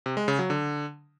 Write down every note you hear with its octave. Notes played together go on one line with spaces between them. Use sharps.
C3
G#3
C#3
F#3
D3